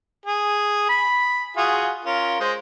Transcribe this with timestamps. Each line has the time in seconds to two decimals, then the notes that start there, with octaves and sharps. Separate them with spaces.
0.26 G#4
0.89 B5
1.57 F4 F#4 G#4
2.05 C#4 F4 A#4
2.40 G#3 C5